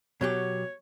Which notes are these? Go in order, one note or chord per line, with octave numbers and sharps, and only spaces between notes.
B2 F#3 G4 C#5